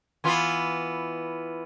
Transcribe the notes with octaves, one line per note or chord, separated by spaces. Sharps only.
E3 B3 F4